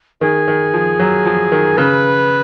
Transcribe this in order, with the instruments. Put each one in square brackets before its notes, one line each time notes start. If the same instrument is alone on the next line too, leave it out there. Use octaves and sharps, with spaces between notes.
[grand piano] D#3 [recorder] G#4
[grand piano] D#3
F3
F#3
F3
D#3
[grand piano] C#3 [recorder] B4